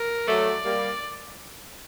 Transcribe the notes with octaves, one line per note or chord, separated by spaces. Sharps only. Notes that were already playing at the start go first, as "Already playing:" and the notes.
Already playing: A#4
F#3 A3 D5
G3 A#3